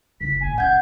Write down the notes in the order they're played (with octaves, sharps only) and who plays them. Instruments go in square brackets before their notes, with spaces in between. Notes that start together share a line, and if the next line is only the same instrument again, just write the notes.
[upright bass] F#1 [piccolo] B6
[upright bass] A1 A#2 [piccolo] G#5
[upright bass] F1 C#4 [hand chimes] F#5 G#6 [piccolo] G6